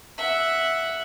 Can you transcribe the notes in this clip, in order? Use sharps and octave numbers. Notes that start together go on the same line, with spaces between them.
E5 F#5